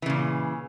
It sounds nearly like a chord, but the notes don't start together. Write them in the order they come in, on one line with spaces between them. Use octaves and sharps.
E3 C#3 A#2